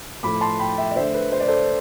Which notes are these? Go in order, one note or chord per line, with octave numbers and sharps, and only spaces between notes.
A2 F3 A3 B5 D6
A5 C6
G5 B5
E5 G5
D5
D3 A3 C5 E5
B4
C5
D5
A4 C5